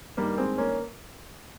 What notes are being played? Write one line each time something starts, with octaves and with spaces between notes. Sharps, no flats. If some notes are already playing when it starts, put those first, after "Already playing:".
G2 D#3 G3 A#3
G#3 C4
A#3 C#4